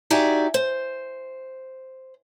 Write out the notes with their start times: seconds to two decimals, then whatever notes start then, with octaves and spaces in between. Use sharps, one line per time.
0.10 D#4 F#4 G4 D5 E5 G#5
0.54 C5